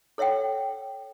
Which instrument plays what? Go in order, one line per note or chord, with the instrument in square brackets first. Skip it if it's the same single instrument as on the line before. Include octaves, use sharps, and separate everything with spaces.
[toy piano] A4 C#5 E5 F#5 G5